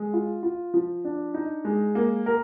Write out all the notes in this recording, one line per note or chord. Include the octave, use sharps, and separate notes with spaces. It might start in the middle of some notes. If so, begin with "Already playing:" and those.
Already playing: G#3
F4
F4
F3
D4
D#4
G#3
A#3
A#4